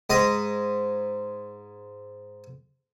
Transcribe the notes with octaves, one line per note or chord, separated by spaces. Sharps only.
G#2 D#5 D#6